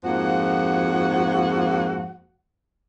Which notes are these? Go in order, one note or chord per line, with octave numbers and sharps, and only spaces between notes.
F2 G#2 F3 A#3 F#4 F#5